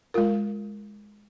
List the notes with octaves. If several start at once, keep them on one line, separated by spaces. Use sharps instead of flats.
G#3 F4 A#4